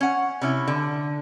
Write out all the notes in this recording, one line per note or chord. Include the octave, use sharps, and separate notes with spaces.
C#4 F#5
C3 C#4 E4
D3